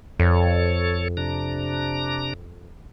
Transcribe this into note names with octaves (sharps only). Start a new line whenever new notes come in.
F2 A4 C#5
C3 D4 A#5